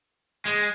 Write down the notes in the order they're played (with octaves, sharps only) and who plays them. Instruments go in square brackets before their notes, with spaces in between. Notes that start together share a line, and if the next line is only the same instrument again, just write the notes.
[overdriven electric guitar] G#3